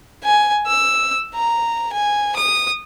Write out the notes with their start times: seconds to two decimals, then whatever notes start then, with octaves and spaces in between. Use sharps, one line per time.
0.24 G#5
0.66 E6
1.35 A#5
1.92 G#5
2.36 D#6